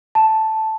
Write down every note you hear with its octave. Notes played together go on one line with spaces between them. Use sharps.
A5